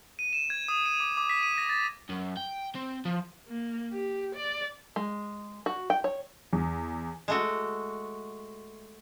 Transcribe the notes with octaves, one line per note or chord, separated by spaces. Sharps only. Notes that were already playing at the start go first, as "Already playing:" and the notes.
D#7
E7
G#6
D#6
D#7
D6
D6
B6
D#7
A#6
A6
F#2
G5
C4
F3
A#3
G4
D5
G#3
F#4
G5
C#5
E2
G#3 A3 F#4